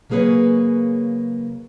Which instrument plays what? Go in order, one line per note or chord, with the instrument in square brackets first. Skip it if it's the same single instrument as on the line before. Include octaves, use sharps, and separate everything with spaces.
[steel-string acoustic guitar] C#3 F#3 A#3 G#4 B4 C#5